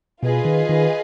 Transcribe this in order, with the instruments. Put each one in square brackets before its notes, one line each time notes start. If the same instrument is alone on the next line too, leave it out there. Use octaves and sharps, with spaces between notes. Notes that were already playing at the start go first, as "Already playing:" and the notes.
[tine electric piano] B2 [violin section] F4 G#4 B4 D#5
[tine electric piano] D#3
D#3